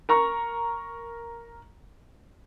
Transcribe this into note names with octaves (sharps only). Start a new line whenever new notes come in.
A#4 A#5 C#6